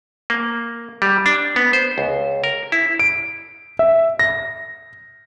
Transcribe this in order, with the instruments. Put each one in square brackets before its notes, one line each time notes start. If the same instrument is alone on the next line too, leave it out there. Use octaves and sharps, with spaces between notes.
[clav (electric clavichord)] A#3
G3
D4
B3
C5
C#2
A#4
E4
[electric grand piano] D7
E5
A#6